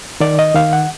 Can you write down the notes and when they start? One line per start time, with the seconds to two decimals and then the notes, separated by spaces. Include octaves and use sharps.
0.20 D#3 D5
0.39 D#5
0.55 D#3 F5
0.73 F#5